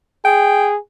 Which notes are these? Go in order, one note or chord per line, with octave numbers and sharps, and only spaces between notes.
G#4 G5